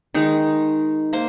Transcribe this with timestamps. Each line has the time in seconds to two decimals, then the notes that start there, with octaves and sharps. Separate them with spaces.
0.14 D#3 G#3 D#4
1.13 A#3 C5